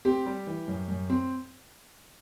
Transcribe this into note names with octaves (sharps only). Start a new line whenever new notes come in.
C4 G4
G3
E3
F#2
F#2
C4